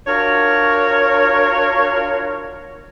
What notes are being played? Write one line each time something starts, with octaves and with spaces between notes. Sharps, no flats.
D4 F4 F#4 A#4 C#5